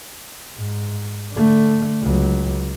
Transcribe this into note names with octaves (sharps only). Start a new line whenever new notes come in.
G#2
D3 A3
C#2 F#3